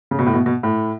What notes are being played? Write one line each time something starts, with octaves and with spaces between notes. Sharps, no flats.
C#3
B2
A2
B2
B2
A2